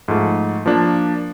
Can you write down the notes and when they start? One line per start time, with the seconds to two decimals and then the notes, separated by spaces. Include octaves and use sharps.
0.08 G#2 F3 A3
0.66 F3 A#3 D4